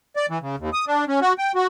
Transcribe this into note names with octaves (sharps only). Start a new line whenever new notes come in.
D5
E3
C#3
D#2
D#6
D4
C#4
F#4
G5
F#4